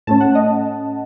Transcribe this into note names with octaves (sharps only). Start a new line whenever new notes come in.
A2 A3 C#4 A5
F#5
D#5